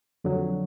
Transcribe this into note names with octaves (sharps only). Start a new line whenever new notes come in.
F2 D3 F#3